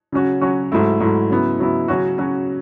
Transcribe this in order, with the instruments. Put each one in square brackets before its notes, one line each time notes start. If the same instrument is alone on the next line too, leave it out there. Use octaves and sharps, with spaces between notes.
[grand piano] C#3 F#3 C#4 F#4
C#3 F#3 C#4 F#4
G#2 F#3 A3 E4
G#2 F#3 A3 E4
C#3 F#3 B3 E4
C#3 F#3 B3 E4
C#3 F#3 C#4 F#4
C#3 F#3 C#4 F#4